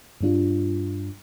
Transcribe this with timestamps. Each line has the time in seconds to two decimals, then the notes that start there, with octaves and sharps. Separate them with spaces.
0.21 G2 G3 D4 F4